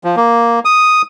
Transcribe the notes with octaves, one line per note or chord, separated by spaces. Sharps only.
F3
A#3
D#6